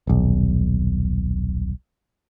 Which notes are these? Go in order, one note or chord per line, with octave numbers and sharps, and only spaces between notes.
D#1 B1